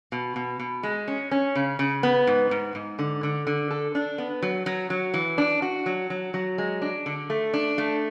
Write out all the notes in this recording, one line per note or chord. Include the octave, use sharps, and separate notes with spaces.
B2
B2
B2
G#3
C#4
C#4
C#3
C#3
B3
G#2
G#2
G#2
D3
D3
D3
A4
D4
B3
F#3
F#3
F#3
E3
D4
F#4
F#3
F#3
F#3
G#3
D4
D3
A3
D4
A3